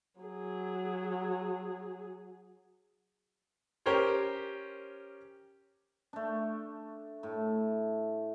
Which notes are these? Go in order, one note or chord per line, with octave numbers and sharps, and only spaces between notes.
F#3 G#4
C#4 G4 A#4 C5 C#5
A3 D4
A2